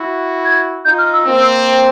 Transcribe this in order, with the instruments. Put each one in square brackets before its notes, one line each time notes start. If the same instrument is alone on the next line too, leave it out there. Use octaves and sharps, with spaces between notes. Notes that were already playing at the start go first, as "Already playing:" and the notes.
Already playing: [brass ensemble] E4 F#4
[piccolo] G#6
[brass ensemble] D#4 F4 [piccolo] G6
[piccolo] F6
E6
[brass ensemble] A#3 C4